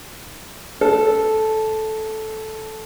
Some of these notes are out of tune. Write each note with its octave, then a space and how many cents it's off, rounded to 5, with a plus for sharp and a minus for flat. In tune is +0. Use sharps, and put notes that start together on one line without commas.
A4 -10